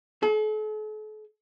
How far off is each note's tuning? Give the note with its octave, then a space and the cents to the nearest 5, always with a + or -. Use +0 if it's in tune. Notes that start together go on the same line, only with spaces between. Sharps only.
A4 -45